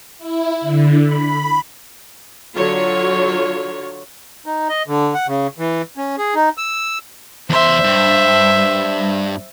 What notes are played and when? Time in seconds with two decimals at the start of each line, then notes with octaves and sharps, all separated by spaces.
0.18 E4
0.61 D3
1.00 B5
2.55 D3 F#3 F4 C#5
4.46 D#4
4.69 D#5
4.88 D3
5.14 F#5
5.27 C#3
5.58 E3
5.97 C#4
6.18 G#4
6.35 D#4
6.58 E6
7.50 E2 C5 E5 C6
7.84 G2